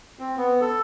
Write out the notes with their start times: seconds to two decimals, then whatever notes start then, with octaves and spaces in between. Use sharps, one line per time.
0.19 C4
0.37 B3
0.61 A4